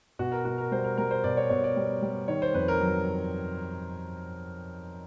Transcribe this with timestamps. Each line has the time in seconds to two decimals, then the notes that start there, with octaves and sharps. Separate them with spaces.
0.19 B2 F#4
0.32 A#4
0.45 B2 F#4
0.58 A#4
0.72 G3 C5
0.84 A#4
0.98 G3 A#4
1.11 C5
1.24 B2 D5
1.37 C#5
1.49 B2 C#5
1.64 D5
1.76 G3
2.02 G3
2.28 D#3 C#5
2.42 C5
2.54 F2 B4
2.68 A#4
2.80 F#3